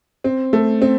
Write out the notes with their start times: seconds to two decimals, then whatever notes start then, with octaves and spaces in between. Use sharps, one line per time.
0.24 C4
0.53 A3
0.82 C4